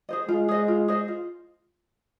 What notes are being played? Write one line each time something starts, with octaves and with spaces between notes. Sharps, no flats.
G#4 C5 D#5
G#3 F4
G#4 C5 D#5
F4
G#4 C5 D#5
F4